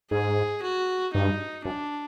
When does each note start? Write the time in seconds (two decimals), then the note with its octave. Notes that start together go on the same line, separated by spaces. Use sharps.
0.11 G#2 G#4
0.62 F#4
1.14 G2 D#4
1.65 F#2 D4